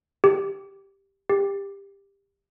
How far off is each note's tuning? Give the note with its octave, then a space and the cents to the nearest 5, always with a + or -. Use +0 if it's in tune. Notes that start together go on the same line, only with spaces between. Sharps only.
G4 +0
G4 +20